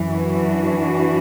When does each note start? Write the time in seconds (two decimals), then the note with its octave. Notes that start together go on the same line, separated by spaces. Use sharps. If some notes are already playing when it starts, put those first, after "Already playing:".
Already playing: F#2 E3
0.09 D4 F#4